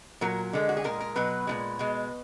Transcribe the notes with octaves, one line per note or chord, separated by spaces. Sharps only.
A#2 F#3 A#4
D3 G#3
F#4
G#4
A#2 G#3 A#4
A#4
B2 F#3 B4
A#2 F3 G#3
B2 G#3